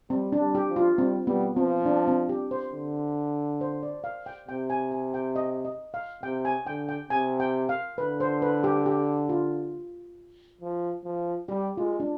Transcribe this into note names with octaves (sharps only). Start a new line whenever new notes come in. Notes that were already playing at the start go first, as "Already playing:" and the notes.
G3 C4
D4
G3
G4
F3
F4
G3 C4
G3 B3
F3 C4
D4
C4
G4
C5
D3
C5
D5
F5
G5
C3 G5
G#5
G#5
G5
D#5
D#5
F5
C3 G5
G#5
D3 G5
G5
C3 G#5
G5
F5
D3 B4
C5
B4
G4
G4
F4
F3
F3
G3 G4
G#3 F4
D4